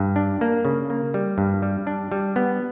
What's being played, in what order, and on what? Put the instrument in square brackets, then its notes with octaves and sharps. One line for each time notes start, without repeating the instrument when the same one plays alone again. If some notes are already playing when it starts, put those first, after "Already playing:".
Already playing: [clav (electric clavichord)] G2
D4
A#3
C#3
A#3
G3
G2
G3
D4
G3
B3